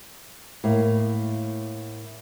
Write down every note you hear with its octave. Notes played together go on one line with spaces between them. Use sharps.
A2 A#3